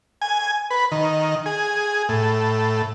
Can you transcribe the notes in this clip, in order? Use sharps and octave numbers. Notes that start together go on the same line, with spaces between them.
G#5
B4
D#3
G#4
A2